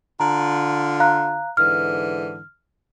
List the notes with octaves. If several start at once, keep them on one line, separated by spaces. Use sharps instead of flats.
D3 F4 A#5
F5 A#5 F#6
G#2 D3 E3 F6